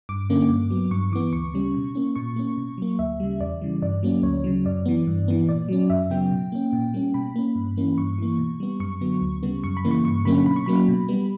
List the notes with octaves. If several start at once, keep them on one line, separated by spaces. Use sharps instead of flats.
G2 D6
D3 A#3 C#4
G2
F#3 B3
G2 C#6
E3 B3 D6
D2 C#6
C#3 G3 C#4
B2
A#3 C#4
A#2 C#6
A#3 C#4
B2
F#3 A#3
D2 E5
C#3 G3
E2 D5
C#3 E3 G3
G2 D5
F#3 A#3 C#4
D2 C#5
C#3 F#3
F#2 D5
E3 B3
G2
E3 B3
A#2 D5
F#3 C#4
F#2 E5
C#3 F#3 B3 G5
B2
A#3 C#4
A#2
G3 A#3 C#4
B2 B5
A#3 C#4
G2
E3 A#3 C#4
G2 C#6
E3 A#3
B2
G3 B3
F#2 C#6
D3 F#3 B3
D2
C#3 G3 B3
F#2 C#6
B5
C#3 E3 A#3
C#6
G2 C#6
D3 F#3 A#3 C#4 B5
B2 B5
C#6
F#3 A#3 C#4 B5
B2
G3 B3